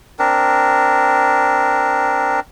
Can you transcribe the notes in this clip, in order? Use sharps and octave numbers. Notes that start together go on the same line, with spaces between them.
C4 D4 A#4